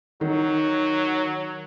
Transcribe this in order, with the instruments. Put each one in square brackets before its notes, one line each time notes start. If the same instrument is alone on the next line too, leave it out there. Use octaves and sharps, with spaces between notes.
[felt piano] D#3 [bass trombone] F#3